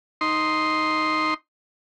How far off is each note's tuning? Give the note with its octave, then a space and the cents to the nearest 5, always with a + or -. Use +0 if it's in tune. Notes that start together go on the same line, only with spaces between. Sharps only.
D#4 +0 C6 +0